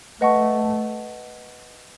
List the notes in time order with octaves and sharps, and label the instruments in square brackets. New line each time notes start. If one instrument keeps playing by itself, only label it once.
[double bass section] A3 [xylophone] B4 D#5 F#5 A5 C#6